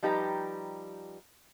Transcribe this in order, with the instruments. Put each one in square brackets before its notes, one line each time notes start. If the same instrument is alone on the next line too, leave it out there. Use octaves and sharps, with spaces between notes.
[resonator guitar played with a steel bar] F3 G3 D#4 G4 B4 A#5